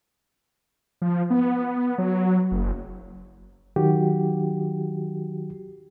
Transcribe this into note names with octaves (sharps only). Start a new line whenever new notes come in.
F3
B3
F#3
F#1
D#3 F#3 F#4 G4